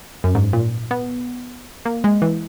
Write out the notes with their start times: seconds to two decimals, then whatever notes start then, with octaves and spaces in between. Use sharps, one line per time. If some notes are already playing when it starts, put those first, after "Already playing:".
0.24 F#2
0.35 G#2
0.53 A#2
0.91 B3
1.85 A#3
2.04 G#3
2.22 E3